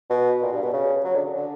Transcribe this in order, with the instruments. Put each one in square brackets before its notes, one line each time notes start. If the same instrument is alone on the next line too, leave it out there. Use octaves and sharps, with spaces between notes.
[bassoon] B2
A#2
G2
B2
C#3
F#3
D3
D3